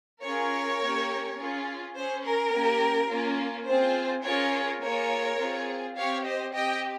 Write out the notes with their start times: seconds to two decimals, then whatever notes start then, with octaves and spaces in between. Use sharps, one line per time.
0.24 C#4 F4 G#4 A#4 C#5
0.81 A#3 C#4 G4
1.38 C#4 F4 G#4
1.96 C#4 G#4 C5
2.25 A#4
2.53 A#3 C#4 G4
3.10 A#3 C#4 F4
3.68 C4 F4 G#4 C5
4.25 C#4 F4 G#4 A#4 C#5
4.82 A#3 F4 G#4 A#4 C#5
5.40 C4 F4 G#4
5.97 C4 G4 C#5 F5
6.25 C5 D#5
6.54 C4 G4 D#5 G5